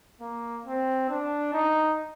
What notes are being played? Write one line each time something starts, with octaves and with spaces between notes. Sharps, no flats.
A#3
C4
D4
D#4